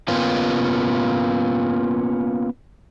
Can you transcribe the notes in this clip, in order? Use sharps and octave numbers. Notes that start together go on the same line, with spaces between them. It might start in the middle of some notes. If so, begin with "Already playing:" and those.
A#3 B3 C#4 F4